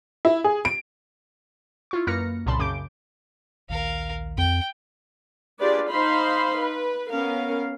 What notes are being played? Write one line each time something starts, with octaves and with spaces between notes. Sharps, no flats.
E4
G#4
D7
E4 F4 C#6
F#2 A#3 B4 F6 A#6 C#7
C2 A#2 C#3 A5 B5 C6
F#2 C#3 D6 G6 D7
A#1 D#2 D#3 A#4 F5
F2 G5
D4 F4 G4 G#4 B4 D5
D#4 C5 F5 B5 C6
B4
B3 C#4 A#4 F5